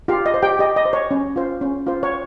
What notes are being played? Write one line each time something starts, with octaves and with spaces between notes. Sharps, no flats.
F4 G4 F5
D#5
C5
G4 G5
G4 D#5
D#5
C5
C#5
C#4
F4 C5
C#4
F4 C5
C#5